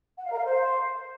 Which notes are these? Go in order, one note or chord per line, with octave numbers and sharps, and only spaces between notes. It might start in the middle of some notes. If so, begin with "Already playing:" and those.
F#5
F5
A#4
F5
C5